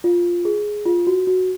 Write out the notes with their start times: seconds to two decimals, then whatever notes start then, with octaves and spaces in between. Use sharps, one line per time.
0.04 F4
0.45 G#4
0.86 F4
1.07 F#4
1.27 F#4